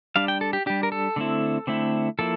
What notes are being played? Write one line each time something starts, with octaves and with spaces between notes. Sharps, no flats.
G3 D4 F5
G5
A4
G4
G3 D4 G4
A#4
A4
D3 A3 C4 E4
D3 A3 C4 E4
F3 A#3 E4 A4